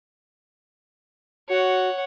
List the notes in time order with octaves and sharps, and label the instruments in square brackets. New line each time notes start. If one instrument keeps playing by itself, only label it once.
[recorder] F#4 [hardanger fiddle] C#5 F#5